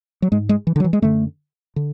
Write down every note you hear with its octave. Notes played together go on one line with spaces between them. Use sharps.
F#3
G#2 G#3
G#3
E3
D3
F#3
E3
G#3
F#2 D3 A3
D3